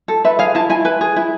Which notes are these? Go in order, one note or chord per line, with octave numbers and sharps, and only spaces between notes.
A4
B4 E5
G#4 F5
E4 A5
E4 G#5
B4 G#5
G#4
E4